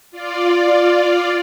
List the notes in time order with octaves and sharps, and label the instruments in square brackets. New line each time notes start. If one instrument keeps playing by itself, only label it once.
[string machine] F4 D5